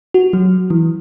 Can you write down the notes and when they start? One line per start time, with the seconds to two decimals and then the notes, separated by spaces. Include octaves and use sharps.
0.14 F#4
0.33 F#3
0.70 E3